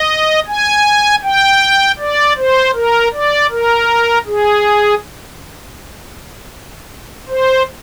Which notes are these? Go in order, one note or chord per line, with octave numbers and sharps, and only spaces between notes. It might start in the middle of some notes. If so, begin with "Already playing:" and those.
Already playing: D#5
G#5
G5
D5
C5
A#4
D5
A#4
G#4
C5